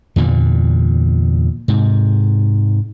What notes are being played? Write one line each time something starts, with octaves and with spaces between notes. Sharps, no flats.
E2 G2 A#2 D3
G#2 C3